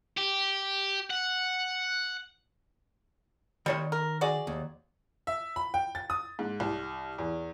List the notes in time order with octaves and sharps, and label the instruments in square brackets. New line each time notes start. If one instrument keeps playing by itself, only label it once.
[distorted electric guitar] G4
F#5
[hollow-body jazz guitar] D#3 C#5 C6 [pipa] G3
[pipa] A#4
F#4 G#4 D5
[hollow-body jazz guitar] D#2
[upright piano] E5
B5
G5
A6
D#6
G#2
C2
E2